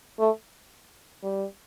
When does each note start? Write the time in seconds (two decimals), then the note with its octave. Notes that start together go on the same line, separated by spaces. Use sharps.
0.19 A3
1.23 G3